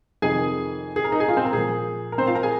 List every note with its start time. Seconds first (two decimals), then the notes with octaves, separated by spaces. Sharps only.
0.22 F2 C3 D#3 G#4 G#5
0.96 G#4
1.04 A#4
1.12 D#4 D#5
1.20 G#4 G#5
1.28 F4 F5
1.37 C4 C5
1.45 A#4
1.53 A#2 F3 G#4
2.12 A#4
2.18 C4 C5
2.27 F4 F5
2.35 A#4 A#5
2.43 G#4 G#5